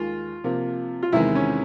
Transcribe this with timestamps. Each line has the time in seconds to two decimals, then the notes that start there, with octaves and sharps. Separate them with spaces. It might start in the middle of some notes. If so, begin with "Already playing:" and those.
Already playing: D#2 D#3 G#3 F4
0.44 C3 F3 A#3
1.03 F4
1.12 E2 C3 D#3 G#3 E4
1.35 C#4